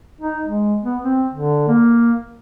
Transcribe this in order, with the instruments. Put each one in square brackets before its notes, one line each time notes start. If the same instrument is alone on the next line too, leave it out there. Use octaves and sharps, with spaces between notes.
[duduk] D#4
G#3
B3
C4
D3
A#3